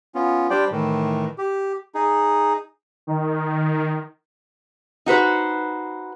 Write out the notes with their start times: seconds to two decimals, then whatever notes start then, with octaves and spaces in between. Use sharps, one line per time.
0.15 B3 C#4 F4
0.50 G3 D4 G4 C5 D5 G5
0.72 A2 D#3 E3
1.38 G4
1.95 D#4 G#4
3.07 D#3
5.06 D#4 F#4 B4 C5